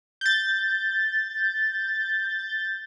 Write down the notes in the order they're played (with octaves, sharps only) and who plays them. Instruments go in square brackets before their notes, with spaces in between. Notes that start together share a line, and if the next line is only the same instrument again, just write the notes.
[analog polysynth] G6 A6